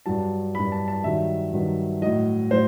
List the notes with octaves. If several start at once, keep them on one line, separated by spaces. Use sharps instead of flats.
G2 F#3 A5
G2 F#3 B5
A5
A5
G2 D#3 F#3 E5
G2 D#3 F#3
A2 F#3 D#5
A2 F#3 C5